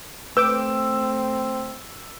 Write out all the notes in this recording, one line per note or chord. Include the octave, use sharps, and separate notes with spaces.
A3 C4 B4 G5 D6 E6